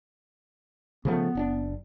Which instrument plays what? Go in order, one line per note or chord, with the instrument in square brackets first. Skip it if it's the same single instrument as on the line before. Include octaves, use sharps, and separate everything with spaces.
[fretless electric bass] C#3 F3 A3 [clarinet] B3
[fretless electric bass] F#1 C#4 D4